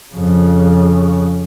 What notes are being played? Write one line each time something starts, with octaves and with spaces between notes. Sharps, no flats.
F2 C#3